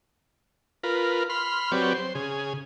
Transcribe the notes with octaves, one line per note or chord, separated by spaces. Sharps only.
F4 A#4 B4
B5 C6 F6
F#3 C4 G4 B4 C#5 D5
C5
C#3 G#4